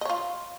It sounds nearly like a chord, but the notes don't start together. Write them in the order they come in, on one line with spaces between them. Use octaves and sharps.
D#5 C#5 F4